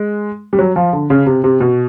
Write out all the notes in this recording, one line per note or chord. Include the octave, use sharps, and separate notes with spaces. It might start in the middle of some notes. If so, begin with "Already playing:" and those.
Already playing: G#3
G3
F#3
F3
D3
C#3
C3
C3
B2